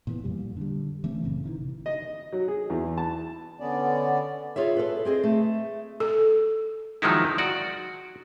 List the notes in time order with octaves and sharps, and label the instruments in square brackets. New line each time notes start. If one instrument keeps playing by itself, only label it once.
[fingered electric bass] A#2 E3 B3
F2 A#2 G3
D3 G3
E3 A3 C4 C#4
F#1 A#2 C#3 C4
C3 D#3 E3
[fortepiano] D#5
F#3
G#4
E2
A5
[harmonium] D3 B3 C#4 D5
[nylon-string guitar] F4 G#4 C#5 E5
A4 B4
C4 G#4 C5 D#5
A3
[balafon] A4
[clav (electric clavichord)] D#3 F3 F#3 G#3 D#4 E4
F#4 D5